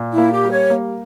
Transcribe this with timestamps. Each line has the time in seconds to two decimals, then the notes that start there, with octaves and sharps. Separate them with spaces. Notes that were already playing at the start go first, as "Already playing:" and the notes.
Already playing: A#2
0.12 E4
0.18 A#3
0.31 G4
0.44 G3
0.51 C#5
0.70 A#3